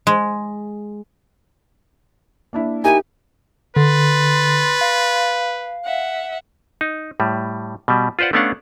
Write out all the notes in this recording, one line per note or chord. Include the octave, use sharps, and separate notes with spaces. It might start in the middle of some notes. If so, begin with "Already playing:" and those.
G#3
A#3 D4 E4
D#4 E4 G4 A#4 G#5
D3 B4 C6 A6
F5
E5 F#5
D#4
A2 G3
B2 G3
F4 B4 C5 D5 F#5
A3 B3 C#4 D4 F5 F#5